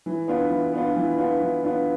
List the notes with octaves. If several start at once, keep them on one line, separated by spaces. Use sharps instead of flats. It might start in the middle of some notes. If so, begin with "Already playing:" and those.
E3
B3 D4 F4
E3
B3 D4 F4
E3
B3 D4 F4
E3
B3 D4 F4